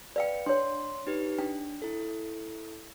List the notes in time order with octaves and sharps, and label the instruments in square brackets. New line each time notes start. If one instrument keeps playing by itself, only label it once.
[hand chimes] B4 C#7 [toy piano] D5 F5 G5
[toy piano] D4 C#5 [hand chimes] C6
[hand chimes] D#4 G4 B4
[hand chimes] D4 [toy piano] G5
[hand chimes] E4 A4